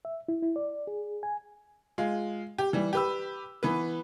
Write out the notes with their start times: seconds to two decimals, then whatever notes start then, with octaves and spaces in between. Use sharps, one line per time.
0.05 E5
0.28 E4
0.43 E4
0.56 D5
0.87 G#4
1.23 G#5
1.98 G#3 F4
2.58 G4
2.73 E3 G3
2.93 G4 B4 E6
3.63 E3 B3 B4